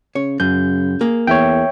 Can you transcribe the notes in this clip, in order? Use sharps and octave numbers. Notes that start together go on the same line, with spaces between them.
C#3 C#5
F#2 C#3 G6
A#3 G#4
E2 C#5 E5 G5